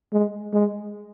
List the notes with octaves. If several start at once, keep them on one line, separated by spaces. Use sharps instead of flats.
G#3
G#3